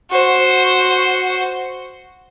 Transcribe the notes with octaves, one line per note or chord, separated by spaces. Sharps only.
F#4 C5